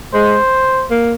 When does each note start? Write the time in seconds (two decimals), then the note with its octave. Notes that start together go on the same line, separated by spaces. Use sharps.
0.14 G#3 C5
0.91 A#3